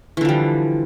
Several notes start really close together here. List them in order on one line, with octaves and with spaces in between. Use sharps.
E3 D3 F3 G3